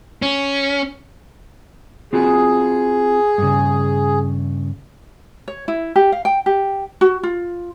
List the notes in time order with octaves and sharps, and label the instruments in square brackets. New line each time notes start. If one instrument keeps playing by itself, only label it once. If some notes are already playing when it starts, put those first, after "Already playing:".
[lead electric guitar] C#4
[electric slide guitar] C4 F4 F#4 [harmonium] G#4
[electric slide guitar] G2 C#3
[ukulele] C#5
E4
G4
F5
G5
G4
F#4
F4